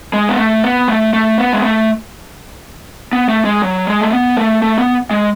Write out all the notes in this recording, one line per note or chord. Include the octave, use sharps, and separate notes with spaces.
G#3
B3
A3
B3
A3
A3
B3
G#3
A3
B3
A3
G#3
F#3
G#3
A3
B3
A3
A3
B3
G#3